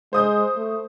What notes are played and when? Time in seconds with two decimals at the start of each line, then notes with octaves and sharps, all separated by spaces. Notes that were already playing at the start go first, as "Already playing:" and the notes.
0.13 G#3 C5 D#6 G6
0.56 A3